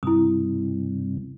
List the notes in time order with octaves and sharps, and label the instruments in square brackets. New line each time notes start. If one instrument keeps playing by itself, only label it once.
[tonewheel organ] G2 C3 [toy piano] E4 D#6